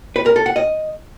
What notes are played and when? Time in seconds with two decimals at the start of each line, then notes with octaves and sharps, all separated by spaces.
0.16 B4
0.26 A#4
0.36 A4
0.46 F#5
0.56 D#5